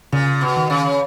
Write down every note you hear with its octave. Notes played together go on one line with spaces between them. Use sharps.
A#2 C#3
B2
D#3
C#3